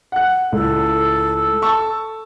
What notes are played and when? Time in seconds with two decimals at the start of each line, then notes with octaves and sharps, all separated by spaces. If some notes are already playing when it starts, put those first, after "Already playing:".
0.12 F#5 F#6
0.52 C#2 A2 A4
1.62 A5 C#6 E6